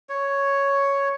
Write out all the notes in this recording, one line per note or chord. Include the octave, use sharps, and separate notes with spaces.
C#5